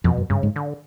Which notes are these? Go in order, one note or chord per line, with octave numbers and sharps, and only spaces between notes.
F2 B2
F#2
G2 C#3
G#2
D3